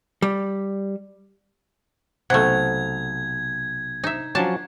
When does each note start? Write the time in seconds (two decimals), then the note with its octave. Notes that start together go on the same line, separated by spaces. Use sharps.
0.22 G3
2.30 B1 C3 A3 F#5 G#6
4.04 D#4 E5
4.35 F3 F#3 C#4 D4 A5